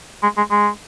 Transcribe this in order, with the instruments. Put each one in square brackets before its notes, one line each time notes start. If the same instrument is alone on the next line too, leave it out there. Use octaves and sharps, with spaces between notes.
[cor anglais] G#3
G#3
G#3